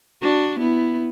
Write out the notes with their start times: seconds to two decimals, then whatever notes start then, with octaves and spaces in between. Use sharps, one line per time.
0.22 D4 F#4
0.59 B3 E4